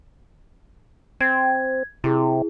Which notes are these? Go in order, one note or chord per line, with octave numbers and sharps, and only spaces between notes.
C4 G#6
C3 E4 G#4